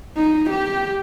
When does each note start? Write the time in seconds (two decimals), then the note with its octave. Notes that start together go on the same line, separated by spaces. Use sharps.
0.16 D#4
0.50 G4